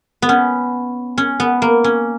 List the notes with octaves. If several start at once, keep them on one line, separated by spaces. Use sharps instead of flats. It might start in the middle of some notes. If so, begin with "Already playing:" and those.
B3
C#4
C#4
B3
A#3
C#4